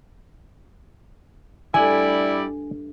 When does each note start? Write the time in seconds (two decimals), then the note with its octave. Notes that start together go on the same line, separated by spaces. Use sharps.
1.74 G2 G3 A3 E4 D5 G#5